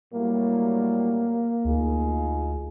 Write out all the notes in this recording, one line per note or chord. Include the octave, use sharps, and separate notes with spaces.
A2 F#3 G3 A#3
D2 D#4 F4 G#4